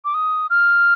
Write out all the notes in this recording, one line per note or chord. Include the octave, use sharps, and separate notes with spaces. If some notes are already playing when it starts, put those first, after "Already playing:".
D6
D#6
F6